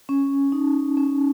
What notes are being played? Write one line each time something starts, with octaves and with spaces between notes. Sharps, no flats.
C#4
D#4
C#4